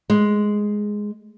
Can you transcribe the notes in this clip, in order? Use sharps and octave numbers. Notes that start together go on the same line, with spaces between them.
G#3